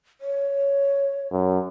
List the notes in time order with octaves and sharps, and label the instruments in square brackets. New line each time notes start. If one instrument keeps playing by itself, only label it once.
[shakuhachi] C#5
[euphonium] F#2